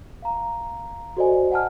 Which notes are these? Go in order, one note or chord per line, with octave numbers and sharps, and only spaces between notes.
F5 A#5
F#4 A4 C5 D5 D#5 G#5
F#5 G#5 A5 F6